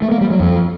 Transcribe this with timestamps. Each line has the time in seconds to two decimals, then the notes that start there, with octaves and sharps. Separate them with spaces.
0.02 A3
0.12 A#3
0.21 G3
0.30 F#3
0.40 F2